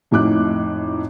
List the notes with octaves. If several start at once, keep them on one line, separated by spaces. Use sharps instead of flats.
F2 A2 D#4 D6 F#6